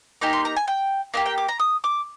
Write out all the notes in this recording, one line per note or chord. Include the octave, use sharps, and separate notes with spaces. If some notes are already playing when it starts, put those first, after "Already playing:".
A#3 D#4 G4 G#5
C6
A#5
G#5
G5
A#3 D#4 G4 F5
G5
D6
A#5
D#6
D6